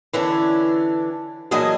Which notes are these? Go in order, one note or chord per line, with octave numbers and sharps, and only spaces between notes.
D3 E3 C#4 D4
A#2 E3 F#3 D4 G#4 D#5